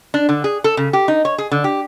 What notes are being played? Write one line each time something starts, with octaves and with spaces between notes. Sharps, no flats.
D4
D3
G#4
A4
C#3
G4
D#4
C#5
G#4
D3
G4